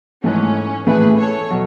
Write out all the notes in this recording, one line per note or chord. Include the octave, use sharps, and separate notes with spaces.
G#2 E3 A3 C#4
A2 E3 A3 E4 G#4 B4
A4 C#5
B2 F#3